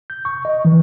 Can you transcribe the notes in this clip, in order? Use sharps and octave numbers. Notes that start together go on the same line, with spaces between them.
G6
C#6
D#5
E3